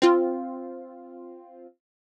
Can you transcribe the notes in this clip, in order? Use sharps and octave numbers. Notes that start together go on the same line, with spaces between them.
C4 F4